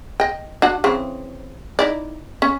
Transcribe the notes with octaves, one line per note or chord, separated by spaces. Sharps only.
D#5 G5
D4 F#4 F#5
C#3 E3 C4
D#4 E4 D5
C#4